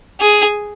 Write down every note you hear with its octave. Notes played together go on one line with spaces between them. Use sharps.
G#4